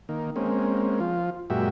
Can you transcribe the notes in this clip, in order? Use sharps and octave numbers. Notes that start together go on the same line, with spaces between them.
D#3 A#3
G#3 A#3 C4 C#4
F3 F4
F#2 A#2 G#3 F#4 G4 E5